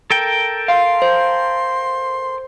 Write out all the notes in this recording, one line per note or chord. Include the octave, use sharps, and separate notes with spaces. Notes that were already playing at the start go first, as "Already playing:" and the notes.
A4 A#4 G5
F5 C6
C5